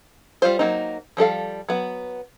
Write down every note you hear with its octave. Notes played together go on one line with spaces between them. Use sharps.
G3 F4 C5
F#3 A#3 C4 D#4
F3 G3 A4 F5
F#3 B3